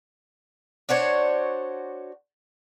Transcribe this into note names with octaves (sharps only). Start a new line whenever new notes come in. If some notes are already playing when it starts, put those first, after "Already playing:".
D4 F#4 C5 C#5